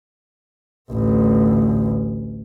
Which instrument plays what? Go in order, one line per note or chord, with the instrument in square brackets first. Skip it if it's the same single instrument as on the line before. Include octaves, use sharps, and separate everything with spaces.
[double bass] A1 D2